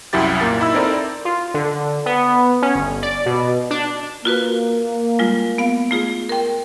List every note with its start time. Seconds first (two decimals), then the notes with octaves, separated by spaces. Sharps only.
0.13 C2 F#2 F#3 E4 G4 A6
0.40 A#2 A#3 A#4 A6
0.60 D#4 E4 B5 E6
0.74 C4 D#4 E4 A4 A#4 D5
1.25 F4
1.54 D3
2.06 B3
2.62 C#4
2.75 G1
3.03 D5
3.26 B2
3.71 D4
4.25 A#3 F4 F#4 B4
5.19 G3 G#3 F4
5.58 B3 F5
5.91 A3 F4 G#4
6.29 A#4 G5